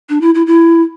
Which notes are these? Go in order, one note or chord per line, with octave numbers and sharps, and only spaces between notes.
D4
E4
E4
E4